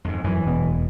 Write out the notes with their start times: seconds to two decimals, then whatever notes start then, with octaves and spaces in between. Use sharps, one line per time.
0.05 F2 G#2
0.24 F#2 E3
0.45 E1 B2